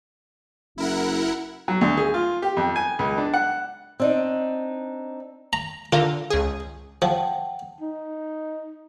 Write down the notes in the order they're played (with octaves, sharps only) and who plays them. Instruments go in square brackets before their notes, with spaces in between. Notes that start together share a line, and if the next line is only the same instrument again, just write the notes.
[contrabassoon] F#1 [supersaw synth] E4 A#4 F#5
[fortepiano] F#3
D2
G#4
F4
G4
F2
G#5
C#2
D4
F#5
[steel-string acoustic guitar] C4 D4 D#4
[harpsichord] A#5
[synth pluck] D3 A#4 [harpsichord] F4
[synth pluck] C#2 G#4
[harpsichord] F3 [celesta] F#5 G5 A5
[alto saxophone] D#4